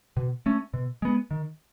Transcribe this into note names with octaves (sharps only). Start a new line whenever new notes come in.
B2
A3 C#4
B2
G#3 B3
D#3